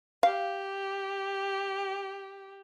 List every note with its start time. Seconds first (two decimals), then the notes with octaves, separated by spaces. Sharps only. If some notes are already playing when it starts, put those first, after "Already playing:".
0.23 G4 F5